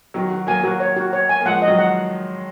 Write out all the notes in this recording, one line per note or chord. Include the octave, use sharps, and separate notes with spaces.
D#3 F#3 F#4
F#4
F#3 A#3 G#5
F#3 A#3 F#4
C#5
F#4
C#5
G#5
A#3
F3 G#3 F#5
D#5
D#3 F#3
F#5